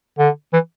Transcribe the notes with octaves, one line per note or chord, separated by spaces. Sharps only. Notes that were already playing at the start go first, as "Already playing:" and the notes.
D3
E3